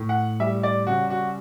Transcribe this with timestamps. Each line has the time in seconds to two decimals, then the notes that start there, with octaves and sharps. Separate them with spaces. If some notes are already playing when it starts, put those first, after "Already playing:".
Already playing: A2
0.09 F#5
0.40 G3 E5
0.63 D5
0.87 C#3 F#4
1.10 F#4